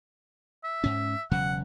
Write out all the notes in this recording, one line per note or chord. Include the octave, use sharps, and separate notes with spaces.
E5
G#2 C#4
E1 C#3 F#3 F#5